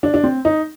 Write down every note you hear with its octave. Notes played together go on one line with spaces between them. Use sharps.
D4
D4
C4
D#4